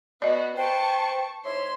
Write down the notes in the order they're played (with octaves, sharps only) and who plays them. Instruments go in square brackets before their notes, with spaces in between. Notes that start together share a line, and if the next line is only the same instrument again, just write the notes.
[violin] B3 F#4 [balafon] D5 D#5
[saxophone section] B4 C5 [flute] G5 [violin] A5 C#6
[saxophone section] G#2 E5 [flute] C#5 [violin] C6